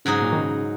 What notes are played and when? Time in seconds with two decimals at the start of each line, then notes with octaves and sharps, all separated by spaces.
0.05 G#2 C#3 F#3 D#4 G#4
0.21 A#2
0.32 D#3
0.37 C#3